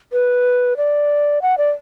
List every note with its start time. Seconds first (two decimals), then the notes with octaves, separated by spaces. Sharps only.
0.13 B4
0.77 D5
1.42 F#5
1.58 D5